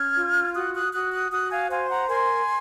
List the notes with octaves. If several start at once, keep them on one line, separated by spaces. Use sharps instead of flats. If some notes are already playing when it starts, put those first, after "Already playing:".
Already playing: C#4 F6 G#6
F4
F#4 D#6 F#6
D#6 F#6
F#4 D#6 F#6
D#6 F#6
F#4 D#6 F#6
F5 G#5
C5 F5 G#5
F#5 A#5
A#4 G#5 C6